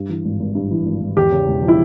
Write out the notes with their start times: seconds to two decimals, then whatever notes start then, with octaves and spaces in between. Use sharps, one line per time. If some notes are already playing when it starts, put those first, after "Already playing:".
Already playing: G2
0.09 E3
0.25 G#1
0.40 G#1
0.55 G2
0.71 E3
0.86 G#1
1.02 G#1
1.17 E2 G4
1.32 C#3
1.48 E1
1.62 F3
1.68 E4